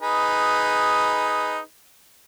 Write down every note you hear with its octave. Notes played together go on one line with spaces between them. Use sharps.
D#4 G#4 B4